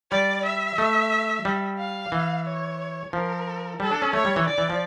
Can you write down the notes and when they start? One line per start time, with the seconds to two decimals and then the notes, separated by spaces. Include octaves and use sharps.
0.11 G3 D5
0.46 E5
0.78 A3
1.45 G3
1.78 F5
2.12 E3
2.46 C#5
3.13 F3 A#4
3.80 G3 A4
3.92 D4
4.02 C#4
4.13 A3 C#5
4.25 G3
4.36 E3
4.47 D5
4.58 E3
4.70 F3